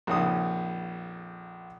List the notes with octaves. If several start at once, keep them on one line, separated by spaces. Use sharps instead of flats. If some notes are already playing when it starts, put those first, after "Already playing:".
A#1 F2 C#3 C#4 D#4 D#6